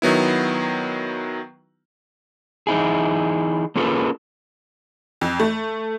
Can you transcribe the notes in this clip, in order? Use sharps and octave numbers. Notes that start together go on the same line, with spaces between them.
D#3 F#3 B3 E4
E3 D#4 E4 G#4
A#3 C#4 F4 G#4 A4 B4
F2
A3